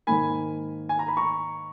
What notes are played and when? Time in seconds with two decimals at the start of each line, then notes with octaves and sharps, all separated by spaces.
0.07 G#2 D#3 A#3 G#5 B5
0.89 G#5
0.99 A#5
1.08 B5
1.17 A#5 C#6